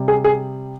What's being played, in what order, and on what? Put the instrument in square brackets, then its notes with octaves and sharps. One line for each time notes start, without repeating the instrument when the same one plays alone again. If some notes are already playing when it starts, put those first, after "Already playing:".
Already playing: [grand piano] C3 G3
G#4
G#4